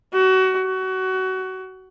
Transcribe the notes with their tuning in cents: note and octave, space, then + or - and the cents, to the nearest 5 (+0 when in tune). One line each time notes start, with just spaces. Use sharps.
F#4 +25
F#4 +25